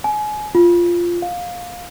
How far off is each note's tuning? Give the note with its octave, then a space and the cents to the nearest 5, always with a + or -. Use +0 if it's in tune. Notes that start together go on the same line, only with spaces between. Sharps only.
G#5 +30
F4 -10
F5 +20